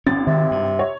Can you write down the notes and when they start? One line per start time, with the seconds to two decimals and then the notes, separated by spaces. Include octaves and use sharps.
0.07 G#1 C#4 A6
0.27 C3 D#3
0.51 G2
0.79 C#5